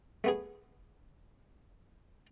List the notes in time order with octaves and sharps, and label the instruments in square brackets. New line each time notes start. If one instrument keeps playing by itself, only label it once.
[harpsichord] A3 B3 G#4